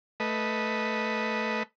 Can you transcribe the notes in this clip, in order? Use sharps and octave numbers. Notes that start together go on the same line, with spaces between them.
A3 B4 D#5